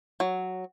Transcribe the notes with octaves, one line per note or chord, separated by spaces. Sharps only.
F#3